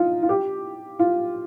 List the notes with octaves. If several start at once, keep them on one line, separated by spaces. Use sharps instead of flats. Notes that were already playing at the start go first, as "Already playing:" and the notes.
Already playing: D#4 F4
F4
G4
F4